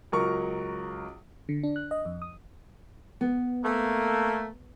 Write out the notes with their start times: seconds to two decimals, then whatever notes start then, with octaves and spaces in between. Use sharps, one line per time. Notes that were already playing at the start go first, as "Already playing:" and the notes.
0.12 C#2 F#3 A#4 A#5 C#6
1.49 D3
1.63 D4
1.76 F#6
1.91 D#5
2.05 F2
2.22 D#6
3.21 B3
3.64 A3 A#3